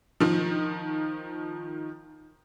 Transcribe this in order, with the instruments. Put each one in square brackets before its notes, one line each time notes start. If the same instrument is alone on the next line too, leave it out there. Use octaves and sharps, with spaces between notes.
[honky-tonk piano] D#3 F3